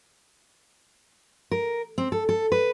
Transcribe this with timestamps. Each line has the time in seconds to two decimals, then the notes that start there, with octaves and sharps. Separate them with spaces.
1.51 A#4
1.98 C4
2.12 A4
2.29 A4
2.52 B4